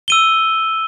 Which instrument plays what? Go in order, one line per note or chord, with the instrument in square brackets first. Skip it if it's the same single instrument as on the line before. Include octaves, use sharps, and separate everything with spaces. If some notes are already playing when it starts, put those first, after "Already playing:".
[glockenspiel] E6 D#7 G7